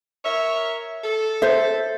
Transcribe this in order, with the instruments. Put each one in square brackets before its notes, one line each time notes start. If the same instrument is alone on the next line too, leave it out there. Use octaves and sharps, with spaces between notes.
[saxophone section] A#4 C#5 E5
A4
[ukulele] C5 E5